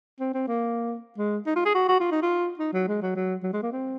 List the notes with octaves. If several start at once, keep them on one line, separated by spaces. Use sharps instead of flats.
C4
C4
A#3
G#3
D#4
F4
G#4
F#4
F#4
F4
D#4
F4
D#4
F#3
G#3
F#3
F#3
F#3
G#3
A#3
C4